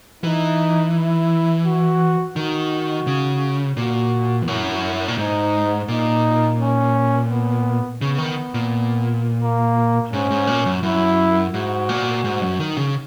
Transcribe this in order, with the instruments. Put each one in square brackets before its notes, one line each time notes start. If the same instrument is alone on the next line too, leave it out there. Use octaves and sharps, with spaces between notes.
[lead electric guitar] E3 [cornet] D#4
[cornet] E4
F#4
[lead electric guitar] D#3 [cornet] F#4
[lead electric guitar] C#3
[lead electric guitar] A#2 [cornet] F#4
[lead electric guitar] E2
[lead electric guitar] F#2 [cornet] E4
[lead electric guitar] A#2
[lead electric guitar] G#2 [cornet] D#4
[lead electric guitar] A#2 [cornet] D#4
[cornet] C#4
B3
[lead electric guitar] C#3 [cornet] B3
[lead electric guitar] D#3
A#2
[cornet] A#3
[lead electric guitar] G#2 [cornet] C#4
[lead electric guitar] G#2
A#2
F#2
[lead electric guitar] F#2 [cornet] E4
[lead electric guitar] G#2 [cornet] F#4
[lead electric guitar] A#2
G#2
F#2
D#3
C#3